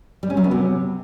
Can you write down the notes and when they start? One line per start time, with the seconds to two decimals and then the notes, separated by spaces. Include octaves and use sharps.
0.23 G3
0.30 C#4
0.37 F#3
0.44 B3
0.51 C3